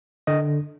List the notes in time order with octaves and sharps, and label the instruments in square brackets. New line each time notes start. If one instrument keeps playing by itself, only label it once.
[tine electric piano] D3 D#5